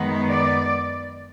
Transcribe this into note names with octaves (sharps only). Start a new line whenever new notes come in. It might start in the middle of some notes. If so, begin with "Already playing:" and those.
Already playing: F#2 D#3 G#3 B3
D5